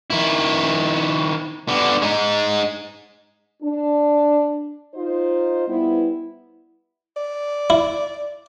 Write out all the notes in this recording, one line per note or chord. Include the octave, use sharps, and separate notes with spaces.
D#3 E4
D3 B3
G#3 D#4
D4
D#4 F4 C5
G3 B3 E4
D5
E4